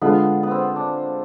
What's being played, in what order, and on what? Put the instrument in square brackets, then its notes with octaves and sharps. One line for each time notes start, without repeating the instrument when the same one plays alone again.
[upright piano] D3 G#3 D4 F4 [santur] B3
[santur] B3
C4
D4